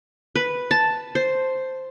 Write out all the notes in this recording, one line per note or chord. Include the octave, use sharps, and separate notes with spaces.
B4
A5
C5